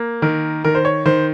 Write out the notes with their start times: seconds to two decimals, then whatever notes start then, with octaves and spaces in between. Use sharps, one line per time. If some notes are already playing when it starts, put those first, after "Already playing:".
Already playing: A#3
0.22 D#3 A#4
0.64 D#3 A#4
0.75 C5
0.85 C#5
1.06 D#3 C5